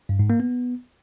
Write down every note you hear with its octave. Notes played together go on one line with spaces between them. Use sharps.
G2
G#2
A#3
B3